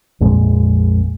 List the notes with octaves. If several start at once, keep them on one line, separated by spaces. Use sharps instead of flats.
A#1 F2 A#2 G#3